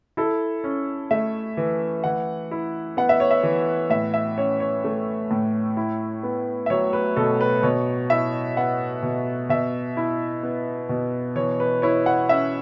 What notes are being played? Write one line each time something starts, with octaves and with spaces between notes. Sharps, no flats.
E4 A4
C#4
A3 E5
E3
E3 F#5
E4
B3 F#5
E5
C#5
E5
E3
A2 E5
E5
C#4 C#5
C#5
A3
A2
E4
B3
E5
F#3 C#5
B4
B2 A4
B4
B2 C#5
E4 E5
B3 F#5
B2
B2 E5
E4
B3
B2
E3 C#5
B4
E4 C#5
F#5
C#4 E5